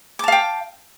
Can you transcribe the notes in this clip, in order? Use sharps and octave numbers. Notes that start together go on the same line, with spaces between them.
F5 G5 A5 D6